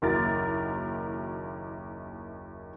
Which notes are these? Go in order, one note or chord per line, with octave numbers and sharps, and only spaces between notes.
F#1 D#2 E4 F#4 A#4 A6